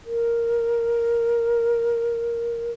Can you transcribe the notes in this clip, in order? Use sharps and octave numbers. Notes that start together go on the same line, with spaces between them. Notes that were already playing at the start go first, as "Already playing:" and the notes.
A#4